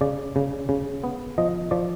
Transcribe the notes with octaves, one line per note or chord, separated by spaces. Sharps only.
C#3 D5
C#3
C#3
B3
F3 D#5
F3 D5